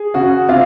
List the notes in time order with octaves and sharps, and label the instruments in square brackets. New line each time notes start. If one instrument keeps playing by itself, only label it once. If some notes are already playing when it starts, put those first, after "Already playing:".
Already playing: [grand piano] G#4
[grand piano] C#3 [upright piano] F#4 F#5
[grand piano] C3 [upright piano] F4 F5